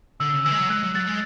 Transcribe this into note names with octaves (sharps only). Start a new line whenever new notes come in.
D3 E6
C#3
E3 E6
G#3
F#3
G#3 F#6
F#3
F#3 A6
G#3